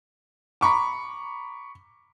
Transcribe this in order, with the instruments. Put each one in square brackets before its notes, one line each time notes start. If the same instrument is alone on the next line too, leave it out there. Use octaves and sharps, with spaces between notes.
[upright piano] A#5 B5 C#6 D6